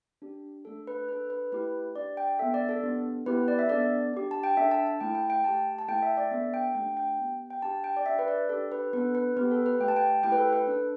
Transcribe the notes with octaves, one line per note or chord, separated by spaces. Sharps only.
D4 G4
A3 D4 A4
B4
D4 A4 B4
B4
A3 E4 G4 B4
D4 G4 D5
G5
B3 D4 A4 E5
D5
A4
B3 D4 G4
B3 E4 G4 B4
D5
E5
B3 D4 A4 D5
D4 G4
A5
G5
D4 A4 E5
A5
A5
A3 E4 A4 G5
G5
G5
A3 G4 A5
A5
A3 E4 A4 G5
E5
D5
B3 D4 A4 E5
G5
A3 D4 G4 G5
G5
B3 G4
G5
D4 G4 A5
G5
D5
D4 G4 E5
B4
D5
D4 G4 A4
B4
B3 D4 A4 B4
B4
B3 G4 B4
A4
B4
A3 G4 G5
A5
G5
A3 E4 G4 G5
B4
A4
B4
D4 A4